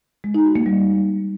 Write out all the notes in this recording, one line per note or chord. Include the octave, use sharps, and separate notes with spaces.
G#3
D#4
F#4
A#3
G3